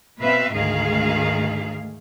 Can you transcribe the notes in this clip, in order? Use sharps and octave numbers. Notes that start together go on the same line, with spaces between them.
B2 C4 B4 E5 F5
D2 G#2 D#3 A3 G#4 F5